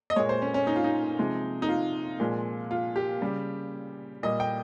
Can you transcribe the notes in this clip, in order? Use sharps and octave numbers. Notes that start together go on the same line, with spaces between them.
D#5
A#2 G#3 C#5
C5
C#4
C#4
D#4
F4
D#4
C3 F3 G#3
D#4
F4
A#2 F3 G#3
F4
G4
C#3 G3
A#2 G3 D#5
G5